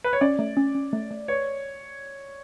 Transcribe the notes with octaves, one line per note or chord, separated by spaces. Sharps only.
B4
C#5
C#4 D5
A3
C#4
C#4
A3
A3
B4 C#5